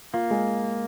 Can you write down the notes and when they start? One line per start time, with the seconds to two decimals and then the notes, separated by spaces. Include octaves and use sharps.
0.13 A#3 F4
0.31 G#3